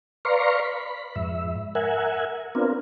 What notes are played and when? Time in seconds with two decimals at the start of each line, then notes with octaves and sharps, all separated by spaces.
0.25 B4 D5 F5 A#5 C6 C#6
0.63 B5
1.16 F2 G#2 E5
1.75 A#4 E5 F#5 G#5
2.55 B3 C4 D4 F4 A#4